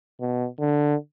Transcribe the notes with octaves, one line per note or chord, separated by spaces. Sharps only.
B2
D3